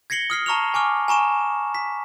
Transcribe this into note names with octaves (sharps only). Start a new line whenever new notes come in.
G#6 A#6 C7 C#7 F#7 G7
D#6 F6 C7
A5 A#5 C#6 F6 F7
G#5 C#6 D6 F6
G#5 A#5 C#6 E7
B6